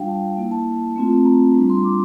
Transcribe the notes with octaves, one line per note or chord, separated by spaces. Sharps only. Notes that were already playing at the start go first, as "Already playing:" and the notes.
Already playing: G3 D4 F4 F5 G5
A5
A#3 E4
A5
A3 C4 F4
A#5
G3 D4 F4 A#5
C6
D6